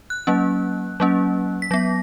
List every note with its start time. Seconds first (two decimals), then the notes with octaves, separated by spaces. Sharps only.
0.10 F#6
0.27 F#3 A#3 C#4
1.00 F#3 A#3 C#4
1.62 B6
1.71 F#3 B3 A#6